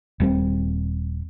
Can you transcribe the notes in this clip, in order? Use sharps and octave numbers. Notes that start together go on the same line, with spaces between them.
D#1 G3 C4